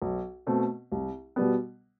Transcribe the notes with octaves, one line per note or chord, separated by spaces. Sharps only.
B1
B2 A3 C4
C2
B2 G3 B3